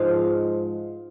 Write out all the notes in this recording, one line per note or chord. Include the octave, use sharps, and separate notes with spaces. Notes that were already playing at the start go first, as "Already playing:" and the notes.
Already playing: G#2 F3 G#3 F5